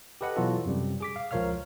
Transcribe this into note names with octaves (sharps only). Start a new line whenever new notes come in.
G4 A4 B4 D#5 F#5
B2 E3 F#3 F4 F#4 A4
F#2 C3 G3
G#4 D6 B6
F5
C#2 F3 A#4 C#5 F5 F6